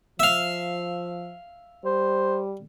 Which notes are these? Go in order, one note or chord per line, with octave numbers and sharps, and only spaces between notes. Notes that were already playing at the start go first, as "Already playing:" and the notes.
F3 E5 F5
G3 C5